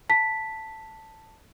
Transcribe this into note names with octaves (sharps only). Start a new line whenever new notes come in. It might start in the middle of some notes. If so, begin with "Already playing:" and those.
A5 B6